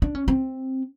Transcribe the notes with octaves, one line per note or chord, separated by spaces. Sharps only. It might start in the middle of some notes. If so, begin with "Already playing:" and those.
D4
C#4
C4